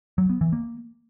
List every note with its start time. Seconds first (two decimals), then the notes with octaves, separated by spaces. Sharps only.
0.18 F#3
0.30 B3
0.41 E3
0.53 A#3